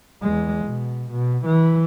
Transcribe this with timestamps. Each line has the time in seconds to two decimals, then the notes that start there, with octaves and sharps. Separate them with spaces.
0.22 E2 G#3
0.65 B2
1.11 B2
1.45 E3